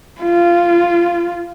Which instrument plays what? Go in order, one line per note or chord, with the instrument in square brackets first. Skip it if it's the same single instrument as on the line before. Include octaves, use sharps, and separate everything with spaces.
[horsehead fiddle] F4